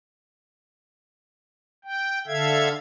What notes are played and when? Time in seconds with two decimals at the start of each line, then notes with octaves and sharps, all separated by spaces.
1.85 G5
2.27 D3 A4 E5 F5 G#6